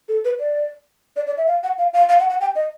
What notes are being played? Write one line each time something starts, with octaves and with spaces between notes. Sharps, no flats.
A4
B4
D5
D5
D5
E5
F5
F#5
F5
F5
F5
F#5
F#5
G5
D#5